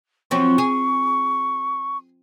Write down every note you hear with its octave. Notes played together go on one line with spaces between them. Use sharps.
F3 F#3 C4 C#6
G#4